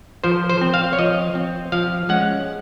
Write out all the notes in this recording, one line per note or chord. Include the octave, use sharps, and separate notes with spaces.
F3 C5
C5
C4
F5
C#5
F3 D#5
C4
F3 F5
G#3 C#4 F#5